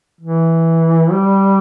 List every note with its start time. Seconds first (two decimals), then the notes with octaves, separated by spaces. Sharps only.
0.21 E3
1.12 G3